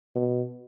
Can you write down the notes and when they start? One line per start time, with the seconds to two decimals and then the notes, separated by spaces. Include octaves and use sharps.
0.15 B2